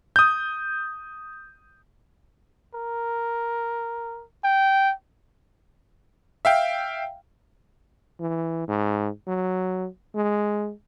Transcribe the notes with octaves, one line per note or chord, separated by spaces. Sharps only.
D#6 G6
A#4
G5
E5 F5 G5
E3
G#2
F#3
G#3